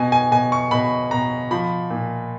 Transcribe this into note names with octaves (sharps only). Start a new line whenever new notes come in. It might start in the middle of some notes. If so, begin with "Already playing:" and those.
Already playing: B2 G#5
G#5
B2 G#5
C#6
B2 B5
B2 A#5
F3 B5
A#2